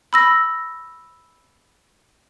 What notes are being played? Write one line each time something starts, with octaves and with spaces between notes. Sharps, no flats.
B5 E6 A#6